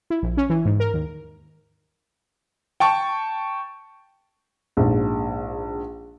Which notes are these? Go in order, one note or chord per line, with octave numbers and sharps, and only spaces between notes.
E4
A#1
C#4
E3
G#2
A#4
D#2
G5 A5 C#6
A#1 G#2